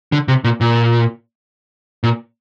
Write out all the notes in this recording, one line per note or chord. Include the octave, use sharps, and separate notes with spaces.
D3
C3
A#2
A#2
A#2